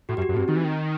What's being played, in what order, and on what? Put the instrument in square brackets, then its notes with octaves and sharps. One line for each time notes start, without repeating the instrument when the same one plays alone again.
[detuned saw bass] A2 [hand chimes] F#4
[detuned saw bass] F#2 [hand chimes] G4
[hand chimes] F#4
[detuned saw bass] F#2
A2
[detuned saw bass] G2 [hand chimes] C4
[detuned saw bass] D#3 [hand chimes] D#4
[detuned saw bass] E3
D#3